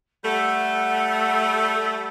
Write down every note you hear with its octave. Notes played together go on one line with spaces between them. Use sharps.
G3 A3 F#5